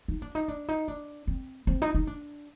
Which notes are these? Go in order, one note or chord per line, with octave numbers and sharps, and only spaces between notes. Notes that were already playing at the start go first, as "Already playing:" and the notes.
D#4
D4
D#4
D4
D#4
D4
C4
C4
D#4
D#4
D4